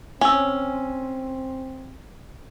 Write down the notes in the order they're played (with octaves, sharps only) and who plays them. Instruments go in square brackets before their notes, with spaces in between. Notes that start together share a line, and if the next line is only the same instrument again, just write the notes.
[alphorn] C4 [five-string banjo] C#4 [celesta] G#5 E6